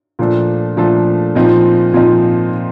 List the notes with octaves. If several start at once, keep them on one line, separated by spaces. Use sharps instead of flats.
A#2 F3 A3 D4 A4
A#2 F3 A3 D4 A4
A#2 F3 C4 D#4
A#2 F3 C4 D#4